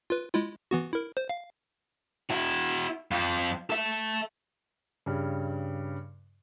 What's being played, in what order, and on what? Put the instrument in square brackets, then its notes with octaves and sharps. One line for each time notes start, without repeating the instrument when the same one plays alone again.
[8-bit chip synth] F4 B4
G#3 E4 F4
E3 B3 F#4
E4 A#4
C5
F5
[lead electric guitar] E4 F#4
F2 F4
A4 E5
[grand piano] G2 C#3